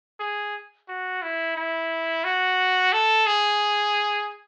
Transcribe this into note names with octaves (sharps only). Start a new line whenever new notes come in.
G#4
F#4
E4
E4
F#4
A4
G#4